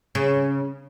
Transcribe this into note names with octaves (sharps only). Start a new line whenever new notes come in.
C#3